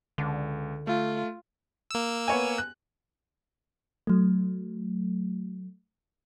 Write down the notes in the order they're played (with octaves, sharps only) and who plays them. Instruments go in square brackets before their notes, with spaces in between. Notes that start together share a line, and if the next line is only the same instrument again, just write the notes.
[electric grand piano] C#2 [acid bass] D3
[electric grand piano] A3 [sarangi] F4
[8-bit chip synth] A#3 E6
[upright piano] B3 C#5 G#5
F#6
[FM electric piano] F#3 A3